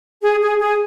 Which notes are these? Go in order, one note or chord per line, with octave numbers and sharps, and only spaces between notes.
G#4
G#4
G#4